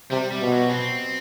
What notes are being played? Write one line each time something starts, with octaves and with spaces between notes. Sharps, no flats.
C3 G3
G3
B2
F#3
C4